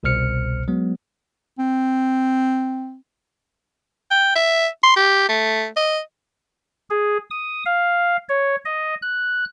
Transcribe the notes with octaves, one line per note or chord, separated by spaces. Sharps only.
G1 C2 B2 C5 F6 C#7
F#3 G#3 B3
C4
G5
E5
C6
G4
A3
D#5
G#4
D#6
F5
C#5
D#5
F#6